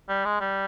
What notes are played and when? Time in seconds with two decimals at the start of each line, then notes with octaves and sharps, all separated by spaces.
0.09 G3
0.25 G#3
0.40 G3